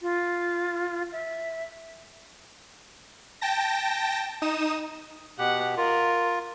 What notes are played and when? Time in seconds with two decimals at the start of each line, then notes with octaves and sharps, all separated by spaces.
0.02 F4
1.12 E5
3.41 G5 A5 A#6
4.42 D#4 D#6 E7
5.39 B2 G4 F#5
5.77 F4 A#4